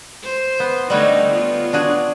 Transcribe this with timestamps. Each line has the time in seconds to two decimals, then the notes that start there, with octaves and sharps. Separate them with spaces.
0.23 C5
0.60 B3
0.90 D3 G3 A3 D#4 F#4 C#5
1.32 B3 F4
1.73 D4 F#4 G#4